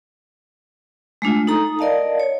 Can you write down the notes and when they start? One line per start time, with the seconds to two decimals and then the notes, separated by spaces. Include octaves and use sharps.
1.22 G#3 A3 D4 F4
1.47 D#4 A4 A#5 D#6
1.79 A#4 D5 D#5 F5 A5
2.20 C#5